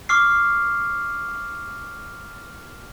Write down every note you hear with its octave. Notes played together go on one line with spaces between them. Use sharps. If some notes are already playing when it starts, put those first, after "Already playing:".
C#6 D6 F6 C7